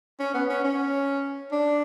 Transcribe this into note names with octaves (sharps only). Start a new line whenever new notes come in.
C#4
B3
C#4
C#4
D4